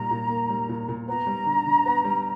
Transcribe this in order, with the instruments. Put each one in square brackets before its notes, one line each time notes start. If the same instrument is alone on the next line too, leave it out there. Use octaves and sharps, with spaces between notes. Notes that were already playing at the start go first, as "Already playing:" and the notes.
Already playing: [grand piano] A#2 G3 A#3 [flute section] A#5
[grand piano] A#2
A#3
G3
A#2
A#2
[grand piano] B3 [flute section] A#5
[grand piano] G3
D3
D3
B3
G3